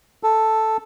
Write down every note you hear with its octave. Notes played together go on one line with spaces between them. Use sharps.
A4